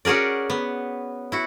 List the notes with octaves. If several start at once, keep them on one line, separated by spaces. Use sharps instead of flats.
C#4 F#4 G#4 A#4 D5
B3
E4 F#4